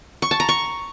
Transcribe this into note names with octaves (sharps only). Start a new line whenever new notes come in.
C#6
A5
A#5
C#6